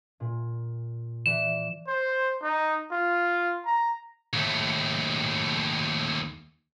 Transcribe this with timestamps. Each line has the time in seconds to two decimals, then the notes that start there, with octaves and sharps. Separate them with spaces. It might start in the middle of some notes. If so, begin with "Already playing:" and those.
0.20 A#2
1.26 E3 D5 E7
1.88 C5
2.43 D#4
2.91 F4
3.65 A#5
4.33 D#2 A3